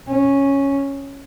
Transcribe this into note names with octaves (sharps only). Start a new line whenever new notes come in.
C#4